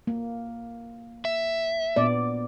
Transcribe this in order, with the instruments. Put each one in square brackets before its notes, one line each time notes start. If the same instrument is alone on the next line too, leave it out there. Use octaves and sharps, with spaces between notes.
[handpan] A#3
[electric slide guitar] E5
[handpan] A#2 B3 D5